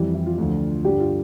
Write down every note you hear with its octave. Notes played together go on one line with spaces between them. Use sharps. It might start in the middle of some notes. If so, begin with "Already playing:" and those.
Already playing: F2 E3 G3
E4
F4
D2 D3 F3
G2 D3 G3 G4
F4